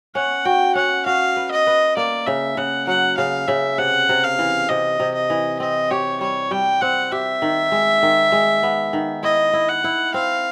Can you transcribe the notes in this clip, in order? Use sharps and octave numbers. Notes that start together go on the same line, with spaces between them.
C#4 F#5
F#4 G5
C#4 F#5
F#4 F5
B4
D#5
B4
A#3 D5
C#3 E5
C#3 F#5
F#3 F#5
C#3 F5
C#3 E5
C3 F#5
C3
F5
E3
C3 D#5
C3
D#5
E3
C4 D#5
G4 C#5
G3 C#5
G3 G5
C4 F#5
G4 E5
D#3
G#3
D#3
G#3
B3
D#3
E4 D#5
E4
F#5
E4
C4 F5